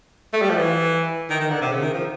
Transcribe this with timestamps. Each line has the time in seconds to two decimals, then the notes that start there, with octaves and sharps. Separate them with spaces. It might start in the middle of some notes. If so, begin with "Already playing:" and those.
0.33 A3
0.42 G3
0.50 F3
0.58 E3
1.30 D#3
1.40 D#3
1.50 D3
1.61 C3
1.72 C#3
1.82 D#3
1.94 F3